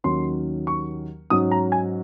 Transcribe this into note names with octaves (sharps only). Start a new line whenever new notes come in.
D#2 D#3 F#3 C#4 C6
C#6
G#2 F#3 C#4 D#6
A#5
G#5